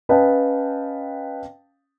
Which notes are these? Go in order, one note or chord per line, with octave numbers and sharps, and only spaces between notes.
C#4 B4 D#5 F5 G5 A5